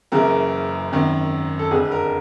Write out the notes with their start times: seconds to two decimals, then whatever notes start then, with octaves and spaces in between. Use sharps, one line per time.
0.12 F#1 F#2 C#3 E3 A#4
0.91 G#1 F#2 D#3
1.59 A4
1.71 F1 F2 D3 G#4
1.91 A#4